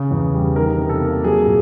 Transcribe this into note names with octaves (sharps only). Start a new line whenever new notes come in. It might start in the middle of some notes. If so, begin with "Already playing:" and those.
Already playing: C#3
E2
G3
D#3 A#4
C3
A4
A#3
F#3 G#4
A#2